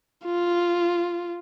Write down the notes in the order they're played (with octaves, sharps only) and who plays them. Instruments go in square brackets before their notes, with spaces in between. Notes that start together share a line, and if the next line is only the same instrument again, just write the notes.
[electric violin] F4